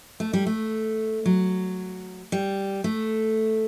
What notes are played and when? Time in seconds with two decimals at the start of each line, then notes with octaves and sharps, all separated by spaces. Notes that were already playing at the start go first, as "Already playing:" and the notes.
0.20 A3
0.33 G3
0.47 A3
1.26 F#3
2.32 G3
2.84 A3